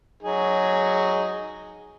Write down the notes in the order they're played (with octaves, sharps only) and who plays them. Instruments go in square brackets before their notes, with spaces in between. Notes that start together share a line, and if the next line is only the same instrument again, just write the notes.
[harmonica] F#3 D#4 G#4